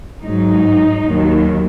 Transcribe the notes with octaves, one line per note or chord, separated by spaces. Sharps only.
G#2 F#3 D#4
D#2 D#3 F#3